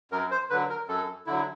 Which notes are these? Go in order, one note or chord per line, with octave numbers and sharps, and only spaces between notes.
F#2 A#4
C5
D3 F#3 B4
A#4
F#2 A4
D3 F#3 E4